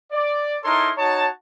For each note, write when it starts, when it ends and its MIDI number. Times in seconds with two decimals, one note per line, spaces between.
0.12 0.56 74
0.64 0.91 63
0.64 0.91 64
0.64 0.91 69
0.64 0.91 70
0.64 0.91 73
0.64 0.91 84
0.97 1.26 63
0.97 1.26 66
0.97 1.26 73
0.97 1.26 81